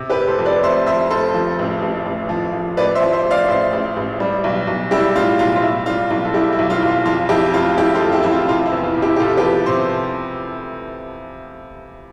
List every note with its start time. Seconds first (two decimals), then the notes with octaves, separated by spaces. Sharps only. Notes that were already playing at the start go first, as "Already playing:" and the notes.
Already playing: C3
0.10 G4 B4
0.15 F1
0.28 A4 C5
0.39 F2
0.45 B4 D5
0.63 F1 C5 E5
0.87 F2 C5 E5
1.11 F1 A4 C5
1.34 F3
1.59 A1
1.82 A1
2.05 A1
2.29 F3
2.53 F3
2.77 A1 B4 D5
2.95 C5 E5
3.02 F3
3.12 C5 E5
3.25 A1
3.30 D5 F5
3.48 A1 C5 E5
3.73 A1
3.96 A1
4.20 G3
4.44 B1
4.67 B1
4.91 G3 E4 G4
5.16 A2 F4
5.39 B1 F4
5.56 F4
5.62 B1 E4
5.86 G3 F4
6.10 B1 F4
6.25 A4
6.34 G3 E4 G4
6.53 E4
6.59 B1
6.70 F4
6.82 B1
6.88 F4
7.05 F2 F4
7.29 F2 E4 G4
7.54 F1 F4
7.78 F2 E4 G4
7.95 F4 A4
8.00 F2
8.12 E4 G4
8.23 F2 E4
8.31 F4
8.49 C3 F4
8.66 E4
8.72 E2
8.84 F4
8.97 C3
9.02 E4 G4
9.16 G4
9.19 C3 F4 A4
9.37 G4 B4
9.43 F3
9.66 C3 C5